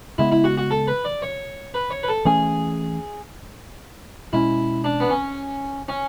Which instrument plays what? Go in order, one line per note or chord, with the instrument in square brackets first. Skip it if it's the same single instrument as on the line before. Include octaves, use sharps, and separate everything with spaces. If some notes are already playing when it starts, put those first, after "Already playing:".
[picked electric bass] C#3 G#3 B3 [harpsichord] E4
[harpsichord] E4
F#4
F#4
A4
B4
D5
C#5
B4
C#5
B4
A4
[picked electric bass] E3 A3 C#4 [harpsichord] G#4
[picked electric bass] B2 G#3 C#4 [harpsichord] E4
[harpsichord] D4
B3
C#4
C#4